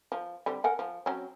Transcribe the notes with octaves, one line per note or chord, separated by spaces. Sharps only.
F3
D3 G3 C4
A#4 F#5 G#5
F3
F#3 C4 C#4